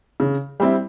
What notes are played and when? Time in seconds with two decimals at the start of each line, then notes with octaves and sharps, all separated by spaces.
0.20 C#3
0.60 G3 C4 E4